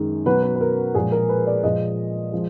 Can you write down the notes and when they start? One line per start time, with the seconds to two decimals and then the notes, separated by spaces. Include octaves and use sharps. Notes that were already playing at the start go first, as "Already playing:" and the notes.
Already playing: F#2 D#3 G#3
0.26 B2 F#3 B4
0.43 B4
0.55 B4
0.61 A#4
0.95 A#2 F3 G#3 G#4
1.12 A#4
1.29 B4
1.47 D5
1.63 A#2 F3 G#3 D#5
2.32 F3 G#3